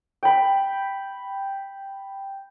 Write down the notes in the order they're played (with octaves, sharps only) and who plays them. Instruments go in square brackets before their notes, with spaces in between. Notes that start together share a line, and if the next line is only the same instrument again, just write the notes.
[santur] G5 B5